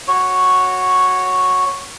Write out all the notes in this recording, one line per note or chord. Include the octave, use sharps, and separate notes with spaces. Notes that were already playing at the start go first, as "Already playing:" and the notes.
F#4 C#5